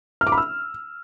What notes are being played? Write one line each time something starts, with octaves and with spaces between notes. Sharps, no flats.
F6
D6
B5
E6